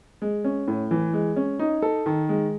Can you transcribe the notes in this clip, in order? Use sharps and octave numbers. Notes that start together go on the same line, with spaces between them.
G#3
C#4
A2
E3
G#3
C#4
D#4
A4
D#3
G#3